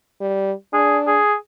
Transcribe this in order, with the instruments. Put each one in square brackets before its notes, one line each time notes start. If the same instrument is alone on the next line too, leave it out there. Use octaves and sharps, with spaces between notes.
[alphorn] G3
[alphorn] D4 [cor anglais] G#4
[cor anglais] G#4